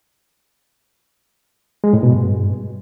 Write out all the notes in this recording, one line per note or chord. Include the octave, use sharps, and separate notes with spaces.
G#3
A2
B2
G2